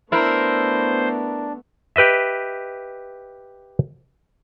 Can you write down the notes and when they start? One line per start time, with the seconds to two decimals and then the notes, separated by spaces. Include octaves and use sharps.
0.12 A3 B3 D4 E4 A#4 C5
1.96 G4 B4 D#5 E5